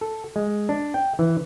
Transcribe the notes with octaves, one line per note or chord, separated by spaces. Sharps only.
A4
G#3
D4
G5
E3